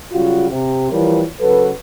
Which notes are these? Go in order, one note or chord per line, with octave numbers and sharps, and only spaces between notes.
C#3 F#3 G3 F4 F#4
C3
E3 F3 G3 A#4 C#5
C#3 F#3 A4 B4